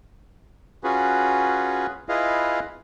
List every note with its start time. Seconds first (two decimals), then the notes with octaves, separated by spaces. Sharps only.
0.84 C#4 F4 F#4 G#4 B4
2.09 E4 F4 G#4 B4 D#5 F5